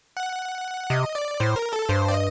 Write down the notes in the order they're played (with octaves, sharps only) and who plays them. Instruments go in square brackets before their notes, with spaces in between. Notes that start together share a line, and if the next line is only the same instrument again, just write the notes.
[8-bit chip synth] F#5
[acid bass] C3 [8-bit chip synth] D#5
[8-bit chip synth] D5
[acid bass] A2 [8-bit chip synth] C5
[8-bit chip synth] A#4
A4
[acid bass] G2 [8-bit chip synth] C5
[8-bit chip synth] D5
D#5